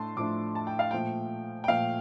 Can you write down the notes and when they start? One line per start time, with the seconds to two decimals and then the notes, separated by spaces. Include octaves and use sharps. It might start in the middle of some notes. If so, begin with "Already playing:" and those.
Already playing: A2 A3 D4 A5 C6
0.16 A2 F3 A3 D4 D6
0.55 A5
0.67 G5
0.79 F5
0.91 A#2 F3 A3 G5
1.64 G5
1.68 A#2 F3 A3 F5